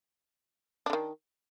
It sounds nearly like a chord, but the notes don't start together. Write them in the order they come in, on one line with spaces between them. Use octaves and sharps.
D4 D3 D#3